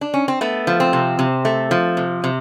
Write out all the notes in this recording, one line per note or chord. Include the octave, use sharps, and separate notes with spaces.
D4
C#4
C4
A3 B3
F3
C4
C3
C3
A3
F3
C3
C3